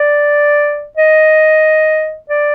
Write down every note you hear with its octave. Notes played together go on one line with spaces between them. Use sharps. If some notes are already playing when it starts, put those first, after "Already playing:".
Already playing: D5
D#5
D5